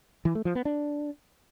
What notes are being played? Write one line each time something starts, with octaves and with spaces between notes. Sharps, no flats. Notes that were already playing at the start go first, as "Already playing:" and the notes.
E3
A3
F3
B3
D4